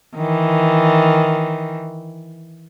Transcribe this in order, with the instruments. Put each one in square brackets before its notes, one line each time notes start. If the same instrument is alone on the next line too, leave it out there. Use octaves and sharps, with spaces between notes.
[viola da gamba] D#3 E3